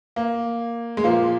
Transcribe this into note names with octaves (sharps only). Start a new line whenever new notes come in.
A#3
G#3
A#2 F3 A#3